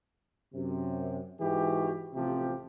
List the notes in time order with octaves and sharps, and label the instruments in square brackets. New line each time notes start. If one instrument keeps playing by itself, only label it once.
[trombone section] F#2 C3
G#2 E3 F#4 G4
A1 C3 F3 G4